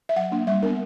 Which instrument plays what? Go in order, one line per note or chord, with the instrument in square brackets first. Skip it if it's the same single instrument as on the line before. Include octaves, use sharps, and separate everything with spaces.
[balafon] E5
F#3 F#5
A#3 D4
G3 E5
D4 A#4
B3